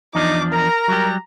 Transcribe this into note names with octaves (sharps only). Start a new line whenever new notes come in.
E2 F3 D4 D#4 D6
A#4 A#5
F#3 G3 G4